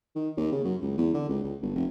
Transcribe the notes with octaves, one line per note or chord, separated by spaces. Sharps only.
D#3
D#2
C#3
F#2
C#2
E2
D3
C#2
C#2
G1
F1